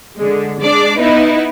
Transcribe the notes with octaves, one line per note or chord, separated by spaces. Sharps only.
D3 G#3
G#3 D4 D5
B3 D#4 E4 B4